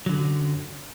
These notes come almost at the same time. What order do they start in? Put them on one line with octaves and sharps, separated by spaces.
F#3 D3 F#2